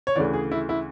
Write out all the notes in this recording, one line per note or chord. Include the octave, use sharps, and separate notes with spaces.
C#5
D2 C#3 E3 D5
G#4
E4
E4